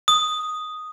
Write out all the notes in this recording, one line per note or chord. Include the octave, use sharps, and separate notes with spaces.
D#6